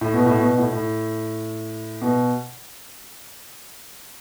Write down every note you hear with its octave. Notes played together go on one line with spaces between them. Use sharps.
A2
B2
A2
B2
B2
A2
A2
B2